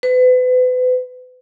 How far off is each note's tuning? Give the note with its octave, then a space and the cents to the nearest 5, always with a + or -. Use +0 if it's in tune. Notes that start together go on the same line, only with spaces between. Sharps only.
B4 +35